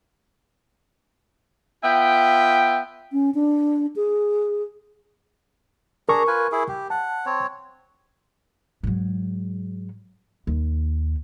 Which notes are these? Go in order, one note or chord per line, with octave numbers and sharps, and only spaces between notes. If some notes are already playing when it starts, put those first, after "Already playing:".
B3 F4 E5 G5
C#4
D4
G#4
D4 G#4 A#4 A#5 C#6
F4 B4 G#5
E4 G#4
G4
F#5 A5
C4 C#5
G#2 F#3
D#2